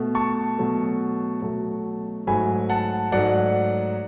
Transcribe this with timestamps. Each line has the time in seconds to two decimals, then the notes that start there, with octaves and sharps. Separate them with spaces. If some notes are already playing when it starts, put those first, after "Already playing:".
Already playing: B2 A3
0.15 A5 C#6
0.58 B2 F#3 A3
1.42 B2 F#3 A3
2.27 G#2 F#3 A3 G#5 B5
2.70 F#5 A5
3.12 G#2 F#3 A3 D5 F#5